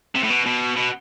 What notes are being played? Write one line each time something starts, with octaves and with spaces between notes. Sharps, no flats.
C3
A2
B2
B2
B2